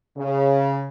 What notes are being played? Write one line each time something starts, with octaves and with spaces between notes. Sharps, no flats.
C#3